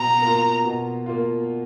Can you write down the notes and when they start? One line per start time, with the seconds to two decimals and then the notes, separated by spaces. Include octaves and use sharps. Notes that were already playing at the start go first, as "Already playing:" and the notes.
Already playing: B2 A#5
0.22 A#3 F4
0.64 B2
1.06 A#3 F4